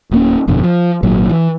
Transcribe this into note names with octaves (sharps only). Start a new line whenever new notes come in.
D1 A#3 C#4
G1 F2 B2 D3
F3
G#1 A#2 F#3
E3